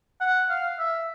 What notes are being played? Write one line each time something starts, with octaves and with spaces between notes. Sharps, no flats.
F#5
F5
E5